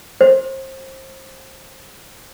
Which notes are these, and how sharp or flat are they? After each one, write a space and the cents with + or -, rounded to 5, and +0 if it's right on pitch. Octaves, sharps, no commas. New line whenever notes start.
C5 +25